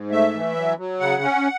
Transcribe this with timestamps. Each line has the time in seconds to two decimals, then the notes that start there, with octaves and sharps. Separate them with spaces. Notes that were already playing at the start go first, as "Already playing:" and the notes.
Already playing: G#2
0.11 A3 E5
0.34 E3
0.56 F#3
0.78 F#3
1.00 C#3 F#5
1.22 C#4